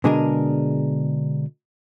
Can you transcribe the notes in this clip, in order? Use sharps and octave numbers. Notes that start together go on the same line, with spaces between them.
B2 D3 G#3 D4 G#4 A#4